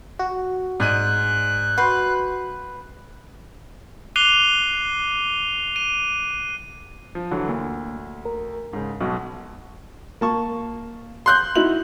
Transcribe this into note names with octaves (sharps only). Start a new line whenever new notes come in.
F#4
G#2 D5 G#5 F#6 D#7
F#4 B4 C6 G6 C7
D6 F#6 C7 D#7 F7 G7
D#7
F3
D3 E3 F#3
D2 A#3
A#4
G#2 C#3
B1 B2
A#3 A5 C#6
C6 F#6 G6
D#4 E4 F#4 F#7